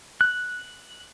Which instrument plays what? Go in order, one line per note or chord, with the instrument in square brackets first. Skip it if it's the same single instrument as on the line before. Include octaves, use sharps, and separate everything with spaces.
[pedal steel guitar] F#6